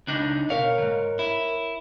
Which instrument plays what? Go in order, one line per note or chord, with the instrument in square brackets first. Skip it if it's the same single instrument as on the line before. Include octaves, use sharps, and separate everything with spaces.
[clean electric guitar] C#2 D4 D#4
[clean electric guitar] B2 F5 [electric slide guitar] A#4 C#5
[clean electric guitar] D2 G#2
E4